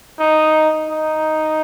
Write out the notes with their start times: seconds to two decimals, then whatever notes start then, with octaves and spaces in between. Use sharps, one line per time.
0.19 D#4
0.90 D#4